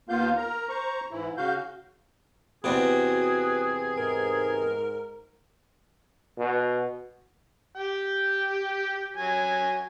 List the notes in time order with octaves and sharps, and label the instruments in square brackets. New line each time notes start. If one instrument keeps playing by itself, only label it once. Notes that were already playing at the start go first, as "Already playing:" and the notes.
[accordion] D#2 A#3 B3 F4 F5 G6
A#4 A#5
C5 A#5 C#6
G#2 E3 E4
C#3 F#4 F5 G6
[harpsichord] E2 C3 [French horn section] F#4 [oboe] G#4 [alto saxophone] B4
[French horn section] G#2 [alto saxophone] A#4
[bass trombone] B2
[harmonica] G4 G5
F#3 G#5